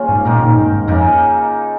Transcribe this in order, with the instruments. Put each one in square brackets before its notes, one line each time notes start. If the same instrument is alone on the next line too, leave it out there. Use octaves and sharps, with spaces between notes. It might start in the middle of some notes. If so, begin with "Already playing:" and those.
Already playing: [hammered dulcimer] C#3 A#3 C#4 F4
[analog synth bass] G#2
[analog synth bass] A#2 [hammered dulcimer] D#3 A#3 D#4 A#4
[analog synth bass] A#2
G#2
G#2
[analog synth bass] F2 [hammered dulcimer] C#3 A#3 D#4 A#4